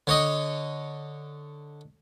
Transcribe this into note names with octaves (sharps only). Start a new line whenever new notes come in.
D3 C#5 D#5